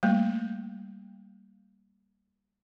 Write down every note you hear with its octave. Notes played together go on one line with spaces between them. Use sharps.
G3 A3 A#3